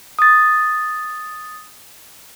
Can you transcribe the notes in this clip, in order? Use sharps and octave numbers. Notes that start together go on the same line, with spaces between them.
D#6 A6